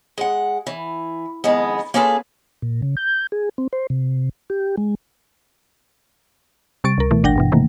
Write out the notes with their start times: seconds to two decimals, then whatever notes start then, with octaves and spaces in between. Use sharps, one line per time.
0.18 G#3 F#5
0.67 E3
1.44 F2 D#3 G#3 B3
1.94 A#3 C#4 F4 G#4 A4 B4
2.62 A#2
2.82 C#3
2.97 G6
3.32 G#4
3.58 C4
3.73 C5
3.90 C3
4.50 G4
4.77 G#3
6.84 C3 G3 C#6 A6 D7
6.98 C#2 A#4
7.11 B2 E3 A3
7.23 G#1 D4 F#5 G5 A#6
7.36 G2 B2 E3
7.52 C3 D#3 E3 A3 A#3